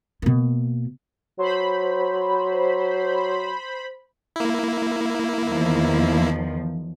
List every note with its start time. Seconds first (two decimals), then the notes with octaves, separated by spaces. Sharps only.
0.22 B2 A#3
1.39 F#3 C5 B5
4.36 A#3 E4
5.47 E2 D#3 F3